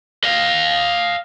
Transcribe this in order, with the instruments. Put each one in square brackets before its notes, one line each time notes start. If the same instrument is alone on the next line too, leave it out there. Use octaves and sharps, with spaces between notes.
[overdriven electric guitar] D#5 F5